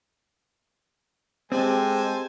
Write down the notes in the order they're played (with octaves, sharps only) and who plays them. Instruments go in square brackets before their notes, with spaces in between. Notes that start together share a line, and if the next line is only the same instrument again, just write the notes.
[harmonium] G#3 [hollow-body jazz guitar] C4 [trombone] G4 [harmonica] A4 C5 G#5